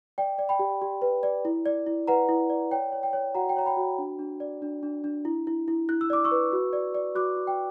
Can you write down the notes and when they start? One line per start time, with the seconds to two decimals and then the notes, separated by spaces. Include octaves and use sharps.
0.18 D5 G5
0.39 D5
0.49 G5 B5
0.59 G4
0.82 G4
1.02 B4
1.23 D5
1.45 E4
1.66 D5
1.86 E4
2.08 B4 F#5 A#5
2.29 E4
2.50 D5
2.71 C#5 G5
2.92 C#5
3.03 G5
3.13 C#5
3.35 F#4 F#5 A#5
3.49 G5
3.57 C#5 A#5
3.66 G5 B5
3.77 F#4
3.98 D4
4.19 D4
4.40 D5
4.62 D4
4.83 D4
5.04 D4
5.25 E4
5.47 E4
5.68 E4
5.89 E4 F#6
6.01 E6
6.10 D5 D6
6.24 C#6 E6
6.31 B4
6.52 F#4
6.73 D5
6.95 D5
7.15 F#4 D6 F#6
7.37 F#4
7.47 G5